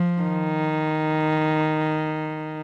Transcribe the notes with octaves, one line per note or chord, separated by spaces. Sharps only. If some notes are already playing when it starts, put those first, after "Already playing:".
Already playing: F3
D#3